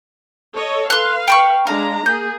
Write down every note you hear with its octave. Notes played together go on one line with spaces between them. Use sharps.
A4 C#5 D#5
B4 F5 C6 F#6
G5 B5 C#6
G#3 D4 F5 A#5
A#3 G#4 G6